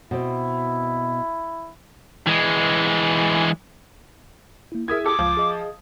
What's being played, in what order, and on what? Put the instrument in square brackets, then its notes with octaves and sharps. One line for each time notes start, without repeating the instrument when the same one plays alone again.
[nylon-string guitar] B2 C4 [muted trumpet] E4
[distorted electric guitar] E3 G#3
[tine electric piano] A#3 E4
[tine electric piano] E4 G#4 [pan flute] A#4 [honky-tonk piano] E5 D#6 G#6
[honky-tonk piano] G4 A4 [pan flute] D6
[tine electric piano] C#2 [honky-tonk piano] F3
[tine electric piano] G#4 D#5